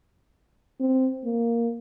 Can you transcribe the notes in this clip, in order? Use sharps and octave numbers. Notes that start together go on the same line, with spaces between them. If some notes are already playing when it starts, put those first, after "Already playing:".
C4
A#3